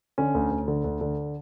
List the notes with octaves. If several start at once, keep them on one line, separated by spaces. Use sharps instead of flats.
D3 C#4
D2
D2
D3
D2
D3